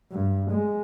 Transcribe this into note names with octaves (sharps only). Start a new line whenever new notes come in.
G2
G#3